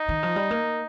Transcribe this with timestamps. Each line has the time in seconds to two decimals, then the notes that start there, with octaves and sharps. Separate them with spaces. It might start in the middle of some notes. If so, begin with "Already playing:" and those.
Already playing: D#4
0.09 D#3
0.23 F3
0.36 G3
0.51 A#3